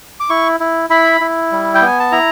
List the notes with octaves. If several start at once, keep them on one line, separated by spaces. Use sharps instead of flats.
D6
E4 C#6
E4
E4 B5
E4
G3
G5
B3 G#5
A5
E4 A#5